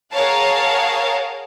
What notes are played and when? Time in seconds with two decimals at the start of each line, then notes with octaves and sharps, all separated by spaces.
0.12 G#4 A#4 C#5 F5 F#5 A5